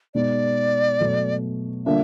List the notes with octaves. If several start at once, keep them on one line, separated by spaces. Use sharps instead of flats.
B2 G#3 B3 D#4 D5
B2 F#3 A3
D3 G3 A#3 D4 F4 E5